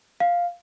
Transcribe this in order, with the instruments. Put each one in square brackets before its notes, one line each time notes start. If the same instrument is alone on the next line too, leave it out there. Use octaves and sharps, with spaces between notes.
[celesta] F5